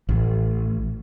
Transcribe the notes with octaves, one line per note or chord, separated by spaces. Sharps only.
A1